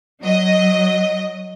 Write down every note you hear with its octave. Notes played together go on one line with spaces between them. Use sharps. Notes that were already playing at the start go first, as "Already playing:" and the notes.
F#3 D#5